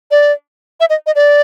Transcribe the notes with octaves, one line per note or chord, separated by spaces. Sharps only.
D5
E5
D#5
D#5
D5